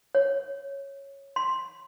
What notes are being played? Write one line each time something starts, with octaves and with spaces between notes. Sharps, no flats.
C#5
C6